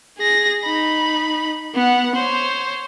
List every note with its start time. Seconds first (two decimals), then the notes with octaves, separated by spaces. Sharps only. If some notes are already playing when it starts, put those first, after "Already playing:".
0.18 G#4 A#6
0.65 D#4 B5
1.74 B3 F#5
2.16 C5 C#5